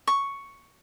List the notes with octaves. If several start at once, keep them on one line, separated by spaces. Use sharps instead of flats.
C#6